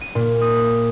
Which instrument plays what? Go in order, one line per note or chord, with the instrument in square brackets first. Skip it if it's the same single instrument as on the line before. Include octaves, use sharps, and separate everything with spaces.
[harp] D#7
A#2
D#6